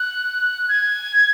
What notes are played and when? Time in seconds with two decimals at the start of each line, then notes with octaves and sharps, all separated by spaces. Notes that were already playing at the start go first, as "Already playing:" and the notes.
Already playing: F#6
0.69 G#6